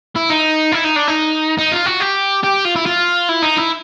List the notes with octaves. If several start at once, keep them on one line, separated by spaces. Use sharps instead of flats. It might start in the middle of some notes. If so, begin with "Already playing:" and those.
E4
D#4
E4
D#4
D4
D#4
D#4
F4
F#4
G4
G4
F4
E4
F4
E4
D#4
E4